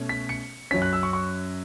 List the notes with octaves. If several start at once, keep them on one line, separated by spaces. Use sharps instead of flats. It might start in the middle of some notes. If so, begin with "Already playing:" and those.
Already playing: B2 A3 C#4
B6
C#7
F#2 F#3 C#4 B6
F#6
E6
C#6
C#6